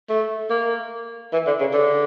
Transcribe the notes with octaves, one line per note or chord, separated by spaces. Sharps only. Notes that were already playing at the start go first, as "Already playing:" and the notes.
A3
A#3
E3
D3
C#3
D3